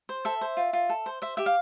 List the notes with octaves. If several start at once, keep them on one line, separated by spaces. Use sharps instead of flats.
C5
A4 E5
C5
F4
F4
A4
C5
C5 E5
G4 E5
F5